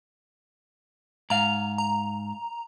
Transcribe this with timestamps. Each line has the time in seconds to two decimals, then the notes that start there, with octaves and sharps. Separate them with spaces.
1.30 G#2 F5 A#5
1.78 A#5